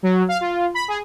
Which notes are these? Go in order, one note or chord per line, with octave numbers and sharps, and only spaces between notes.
F#3
F5
F4
B5
G#4